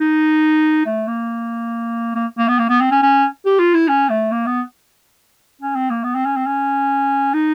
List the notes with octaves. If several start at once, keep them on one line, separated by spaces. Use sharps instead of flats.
D#4
A3
A#3
A#3
A#3
B3
A#3
B3
C4
C#4
C#4
G4
F4
E4
C#4
A3
A#3
B3
C#4
C4
A#3
B3
C4
C#4
C4
C#4
D#4